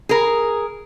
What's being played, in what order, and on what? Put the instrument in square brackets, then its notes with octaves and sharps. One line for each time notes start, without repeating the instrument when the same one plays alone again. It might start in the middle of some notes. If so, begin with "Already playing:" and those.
[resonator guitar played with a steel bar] G#4 A#4